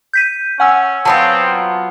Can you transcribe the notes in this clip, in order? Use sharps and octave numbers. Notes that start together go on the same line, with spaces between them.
G6 B6 D#7
C#4 F#5 G#5 E6
F#3 B3 C4 F4 A5